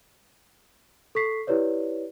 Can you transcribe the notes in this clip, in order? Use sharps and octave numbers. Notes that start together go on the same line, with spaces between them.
A4 C#6 B6 C7
E4 G4 B4 C#5 D5